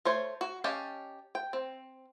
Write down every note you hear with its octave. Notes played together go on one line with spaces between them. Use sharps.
A3 C5 C#5
F#4
C#4 G4 D#5 F5 A5
G5
C4